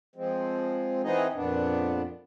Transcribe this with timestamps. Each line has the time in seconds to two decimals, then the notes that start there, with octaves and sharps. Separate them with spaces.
0.16 F3 G#3 C4
1.03 E3 B3 C4 D#4 G#4 D#5
1.34 F2 A#2 B3 D4